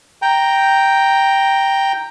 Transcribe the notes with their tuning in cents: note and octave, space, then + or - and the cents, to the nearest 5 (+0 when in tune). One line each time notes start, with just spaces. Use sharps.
G5 +0 A#5 +0